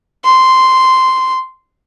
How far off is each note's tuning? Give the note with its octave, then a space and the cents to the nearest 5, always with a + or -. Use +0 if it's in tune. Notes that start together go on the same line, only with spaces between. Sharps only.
C6 -5